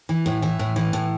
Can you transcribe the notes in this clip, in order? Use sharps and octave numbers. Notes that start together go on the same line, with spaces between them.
E3
A2
E3
A2
E3
A2